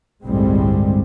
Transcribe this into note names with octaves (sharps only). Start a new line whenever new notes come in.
G1 C2 A2 G3 G#3 C4